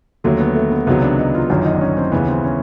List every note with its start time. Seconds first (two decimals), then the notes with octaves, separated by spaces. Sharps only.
0.24 D#2 D3 F#3 A3
0.40 B3
0.55 A3
0.71 B3
0.87 C#2 C3 D#3 F#3 B3
1.02 D4
1.19 D#4
1.35 F4
1.50 G1 F#2 D#3 F#3 F4
1.65 D#4
1.74 D4
1.81 C#4
1.97 C4
2.12 D#2 C#3 E3 B3
2.28 C4
2.44 C#4